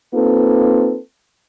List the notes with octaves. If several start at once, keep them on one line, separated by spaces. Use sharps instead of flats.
A#3 C4 D#4 F4 A4 B4